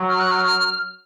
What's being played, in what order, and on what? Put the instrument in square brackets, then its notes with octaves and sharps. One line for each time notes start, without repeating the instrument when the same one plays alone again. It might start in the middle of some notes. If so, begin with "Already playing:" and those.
Already playing: [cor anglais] F#3
[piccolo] F6
F#6
F6